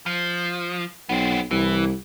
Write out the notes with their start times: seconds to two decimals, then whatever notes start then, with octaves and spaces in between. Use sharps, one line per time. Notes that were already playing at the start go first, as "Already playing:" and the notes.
0.06 F3
1.09 B1 B3 C4
1.51 C2 E3